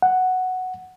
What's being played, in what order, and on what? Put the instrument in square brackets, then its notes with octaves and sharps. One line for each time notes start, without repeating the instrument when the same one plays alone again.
[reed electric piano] F#5